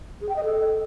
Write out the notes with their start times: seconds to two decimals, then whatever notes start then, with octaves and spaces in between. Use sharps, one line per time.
0.21 G#4
0.29 G5
0.36 D#5
0.44 A4